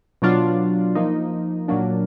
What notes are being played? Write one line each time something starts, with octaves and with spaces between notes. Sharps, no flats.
B2 F#3 D4 F4
F3 A#3 D#4
A#2 F#3 A#3 D4